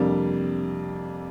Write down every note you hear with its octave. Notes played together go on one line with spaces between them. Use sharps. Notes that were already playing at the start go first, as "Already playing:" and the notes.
Already playing: F2 C3 G3 A#3 D4